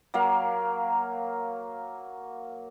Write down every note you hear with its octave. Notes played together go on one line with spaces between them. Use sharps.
F#3 A#3 F5